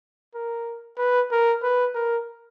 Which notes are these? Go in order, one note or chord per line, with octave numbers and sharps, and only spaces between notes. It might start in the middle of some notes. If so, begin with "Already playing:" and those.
A#4
B4
A#4
B4
A#4